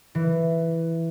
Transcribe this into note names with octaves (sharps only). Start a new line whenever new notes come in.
E3